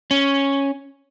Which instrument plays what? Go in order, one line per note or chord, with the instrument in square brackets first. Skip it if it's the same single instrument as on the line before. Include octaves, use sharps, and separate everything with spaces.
[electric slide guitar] C#4